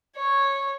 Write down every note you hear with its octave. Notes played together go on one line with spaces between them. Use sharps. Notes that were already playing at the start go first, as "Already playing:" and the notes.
C#5